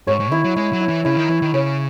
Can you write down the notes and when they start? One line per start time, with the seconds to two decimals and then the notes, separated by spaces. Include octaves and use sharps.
0.07 G#2 C#5
0.20 G#2
0.31 D#3 E4
0.44 F#3
0.56 G#3 E4
0.73 F#3
0.81 E4
0.89 E3
1.05 C#3 E4
1.17 D#3
1.29 E3 E4
1.42 D#3
1.54 C#3 C#5